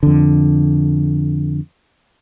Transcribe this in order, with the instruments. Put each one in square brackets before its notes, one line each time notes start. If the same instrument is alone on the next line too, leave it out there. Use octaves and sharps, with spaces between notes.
[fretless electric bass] F2 D3